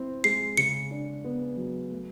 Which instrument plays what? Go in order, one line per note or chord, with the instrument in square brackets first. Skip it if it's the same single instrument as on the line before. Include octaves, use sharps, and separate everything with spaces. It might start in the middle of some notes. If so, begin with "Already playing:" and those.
Already playing: [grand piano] C4 E4
[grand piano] G#3 [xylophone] C7
[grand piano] C#3 [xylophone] C#7
[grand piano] D4
B3
F#3
A3